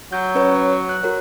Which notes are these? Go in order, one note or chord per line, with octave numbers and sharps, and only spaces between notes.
F#3 G6
C#4 B4 C#5
F#6
F#4 A#4 C#5